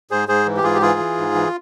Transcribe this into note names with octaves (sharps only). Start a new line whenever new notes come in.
G#2 G#4 C5
G#2 G#4 C5
E3
G4
G#2 F4 G#4
G4
E3 F4 G#4
E3
G#2
E3